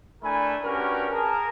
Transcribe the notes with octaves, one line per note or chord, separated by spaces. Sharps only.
A3 D4 E4 A#4 G#5 B5
C#4 D4 F#4 G4 A#4 B4
G#4 A#4 A5